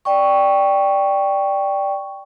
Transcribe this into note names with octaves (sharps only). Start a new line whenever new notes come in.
D5 G5 C#6